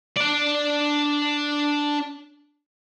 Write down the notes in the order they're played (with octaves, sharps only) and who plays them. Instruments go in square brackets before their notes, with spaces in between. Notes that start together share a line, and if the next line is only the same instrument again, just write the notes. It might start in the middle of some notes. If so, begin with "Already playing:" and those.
[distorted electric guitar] D4 D5